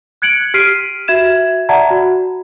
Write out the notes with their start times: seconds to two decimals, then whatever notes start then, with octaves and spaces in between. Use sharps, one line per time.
0.22 F#6 G#6 C#7 D7 F#7
0.54 G4 F6 B6 C7 D7 D#7
1.08 F#4 E5 G#6 E7
1.69 D5 E5 F#5 A5 A#5 G#6
1.91 F#4